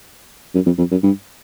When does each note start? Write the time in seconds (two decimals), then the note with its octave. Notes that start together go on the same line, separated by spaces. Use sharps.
0.55 F#2
0.66 F2
0.78 F2
0.91 F#2
1.04 G2